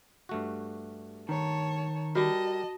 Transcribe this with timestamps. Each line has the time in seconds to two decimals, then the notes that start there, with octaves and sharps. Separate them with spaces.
0.29 G2 A3 F#4
1.29 D#3 C#5 A5
2.15 G3 F#4 G4 A#4 D#5 A5